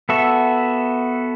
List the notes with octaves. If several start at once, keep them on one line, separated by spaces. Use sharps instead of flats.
B3 F#4 A4 E5